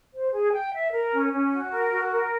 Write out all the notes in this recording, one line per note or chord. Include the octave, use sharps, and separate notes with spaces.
C5
G#4
G5
E5
A#4
C#4
C#4
F#4
A#4
F#4
A#4